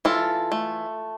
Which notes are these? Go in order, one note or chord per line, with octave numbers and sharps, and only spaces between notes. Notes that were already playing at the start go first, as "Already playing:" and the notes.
E3 F4 A4
A3